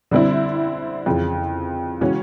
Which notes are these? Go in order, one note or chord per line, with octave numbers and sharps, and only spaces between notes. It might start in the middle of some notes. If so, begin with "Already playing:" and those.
D3 G3 C4 E4
F2 C#3 E3
C#3 E3 G#3 C#4 F#4